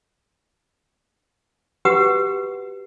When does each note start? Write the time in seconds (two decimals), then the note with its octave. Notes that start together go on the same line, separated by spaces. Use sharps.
1.85 F#4 G4 B4 F#5